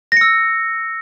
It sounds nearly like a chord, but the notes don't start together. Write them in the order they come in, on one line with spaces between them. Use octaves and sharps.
A#6 C#7 E6